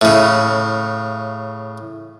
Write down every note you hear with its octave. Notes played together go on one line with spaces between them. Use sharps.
A2 C#3